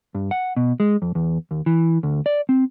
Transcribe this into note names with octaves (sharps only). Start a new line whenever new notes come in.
G2
F#5
B2
G#3
F2
E2
D#2
E3
D2
D5
C4